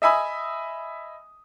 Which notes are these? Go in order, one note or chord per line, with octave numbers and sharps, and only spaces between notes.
D#5 E5 G#5 B5 D#6